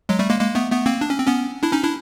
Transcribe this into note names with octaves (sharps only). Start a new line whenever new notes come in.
F#3 G#3
G3 A3
G#3 A#3
G#3 A#3
A3 B3
A3 B3
A#3 C4
D4
C#4
C4
B3 C#4
D4 E4
C#4 D#4
D4 E4